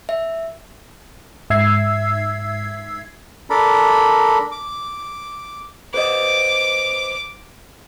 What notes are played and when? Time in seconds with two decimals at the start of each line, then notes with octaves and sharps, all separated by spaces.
0.09 E5
1.50 G#2 E5 E6 G#6 C7
3.50 D4 A4 A#4 B5
4.52 D6
5.94 B4 C5 D#5 D6